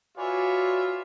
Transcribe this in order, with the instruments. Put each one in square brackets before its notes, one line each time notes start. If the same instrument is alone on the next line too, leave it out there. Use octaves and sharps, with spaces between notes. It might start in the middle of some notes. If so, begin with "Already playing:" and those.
[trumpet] F4 [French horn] F#4 [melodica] B4 D5 G#5 [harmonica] C#5 E5